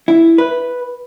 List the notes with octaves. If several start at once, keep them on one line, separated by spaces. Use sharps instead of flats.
E4
B4